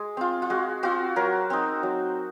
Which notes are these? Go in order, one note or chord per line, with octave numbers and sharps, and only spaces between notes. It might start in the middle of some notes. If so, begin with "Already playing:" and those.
Already playing: G#3 G#4
C4 F4
F4
G#3 F#4
C4 F4 F#4
F#3 A#4
C4 D#4
F#3